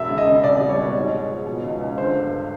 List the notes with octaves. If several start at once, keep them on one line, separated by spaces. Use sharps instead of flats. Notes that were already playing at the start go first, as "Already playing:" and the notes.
Already playing: E1 E5
C#3
D#5
C#3
C2 D5
G3
C#5
B2
G#2
G#3
F3
B2
C#2
C#2
D3 C5
G2